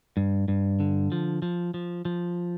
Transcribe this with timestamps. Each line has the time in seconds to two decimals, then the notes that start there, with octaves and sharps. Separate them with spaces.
0.17 G2
0.48 G2
0.80 D3
1.12 F3
1.42 F3
1.74 F3
2.05 F3